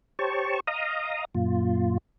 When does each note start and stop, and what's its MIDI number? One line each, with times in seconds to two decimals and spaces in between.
0.19 0.60 67
0.19 0.60 72
0.19 0.60 73
0.19 0.60 81
0.19 0.60 85
0.67 1.25 75
0.67 1.25 77
0.67 1.25 82
0.67 1.25 87
1.34 1.98 42
1.34 1.98 46
1.34 1.98 65